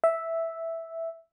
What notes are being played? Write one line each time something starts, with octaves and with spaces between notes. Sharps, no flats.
E5